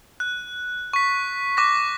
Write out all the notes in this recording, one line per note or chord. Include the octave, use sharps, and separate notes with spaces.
F#6
C#6 B6
C#6 D6 F#6 A#6